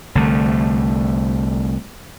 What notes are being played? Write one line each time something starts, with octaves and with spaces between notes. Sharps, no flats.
C2 D3 A3